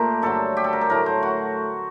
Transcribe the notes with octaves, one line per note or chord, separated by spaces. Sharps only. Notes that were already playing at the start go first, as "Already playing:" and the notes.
Already playing: A#2 A3 G4 A#4 C5
G2 D3 F#3 A4
G4
A4
A#4
A4
A2 F#3 A3 A#4
C5
F#4